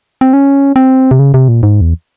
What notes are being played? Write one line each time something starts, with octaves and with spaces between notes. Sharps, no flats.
C4
C#4
C4
C3
C#3
C3
A#2
G#2
E2